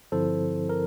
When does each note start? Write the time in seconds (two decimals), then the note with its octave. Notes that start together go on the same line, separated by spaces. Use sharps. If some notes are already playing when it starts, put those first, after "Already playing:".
0.12 G2 D3 F3 C4 E4 A4 C5
0.69 A#4